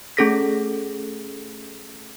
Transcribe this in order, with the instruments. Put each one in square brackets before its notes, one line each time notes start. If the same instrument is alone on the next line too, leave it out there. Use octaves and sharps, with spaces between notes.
[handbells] A3 C#4 G#4 A4 A#6 B6